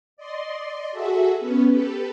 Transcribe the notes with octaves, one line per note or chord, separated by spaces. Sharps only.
D5 D#5 C6
F#4 G#4 A4 E5
B3 C#4 B4
G4 A4 B4